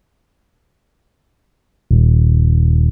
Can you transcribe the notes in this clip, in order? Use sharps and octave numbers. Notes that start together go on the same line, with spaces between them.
D#1